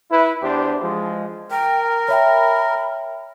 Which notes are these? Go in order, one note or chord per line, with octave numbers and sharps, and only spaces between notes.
E4 B4
E2 D4 G4 C5
F3 G#3
A#4 G5
C#5 E5 G5 B5